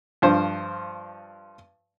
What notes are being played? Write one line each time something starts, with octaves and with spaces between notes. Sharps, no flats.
G2 F3 C5